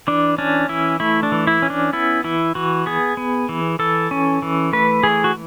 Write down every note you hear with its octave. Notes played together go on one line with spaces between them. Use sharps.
E3 D4
C#4 D4
E3 E4
A3 E4
D4
E3
E4
C#4
D4
B3 E4
E3 E4
E3 F#4
B3 G#4
B3
E3
E3 A4
C#4
E3
A3 B4
E3 G#4
F#4